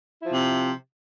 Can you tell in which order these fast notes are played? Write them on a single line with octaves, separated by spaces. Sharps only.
E4 F3 C3